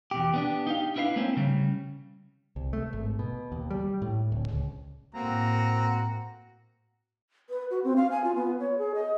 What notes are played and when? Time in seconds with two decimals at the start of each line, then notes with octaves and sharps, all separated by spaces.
0.11 E2 B2 G4
0.34 B3 D4 G4
0.67 D#4 G4 F5
0.96 D4 E4 B4 D#5 F5
1.16 A3 A#3 C4 C#4 E4
1.37 C#3 G3
2.56 C2
2.73 A3
2.93 G#1
3.19 B2
3.52 D#2
3.71 G3
4.02 A2
4.32 D1
4.47 C#2
5.15 A2 A#3 C4 F#4 A#5
7.50 B4
7.71 F#4
7.84 C4
7.96 F5
8.11 G#5
8.24 F4
8.36 B3
8.60 C#5
8.78 G#4
8.95 D#5